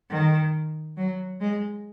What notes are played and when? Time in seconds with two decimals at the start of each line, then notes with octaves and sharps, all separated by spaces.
0.10 D#3
0.97 F#3
1.41 G#3